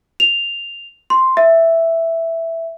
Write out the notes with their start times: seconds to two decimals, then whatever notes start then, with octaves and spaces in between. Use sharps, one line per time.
0.20 F7
1.10 C6
1.37 E5